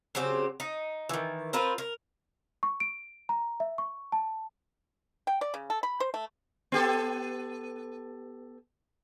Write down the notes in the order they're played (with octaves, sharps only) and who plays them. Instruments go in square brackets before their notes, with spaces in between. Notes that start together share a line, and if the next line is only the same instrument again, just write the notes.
[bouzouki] C#3 F#3 C4 G4
D#4
D#3 E3
C4 F4 A#4 B4
A#4
[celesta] C#6
D7
A#5
E5
C#6
A5
[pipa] G5
D5
C#3
A4
B5
C5
A3
[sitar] B3 G4 A4